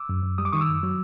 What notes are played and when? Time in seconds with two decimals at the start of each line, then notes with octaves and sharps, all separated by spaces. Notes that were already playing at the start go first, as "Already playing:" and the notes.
Already playing: D6 E6
0.09 F#2
0.24 F#2
0.38 G3 D#6
0.45 D6
0.52 D#3 C#6 D#6
0.61 D6 E6
0.68 F#2
0.83 F#3